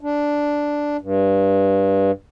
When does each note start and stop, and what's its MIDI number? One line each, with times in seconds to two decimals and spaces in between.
0.01 0.97 62
1.01 2.11 43